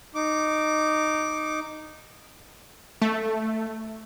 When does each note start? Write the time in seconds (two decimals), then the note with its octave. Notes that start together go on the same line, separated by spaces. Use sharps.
0.15 D#4 D6
3.02 A3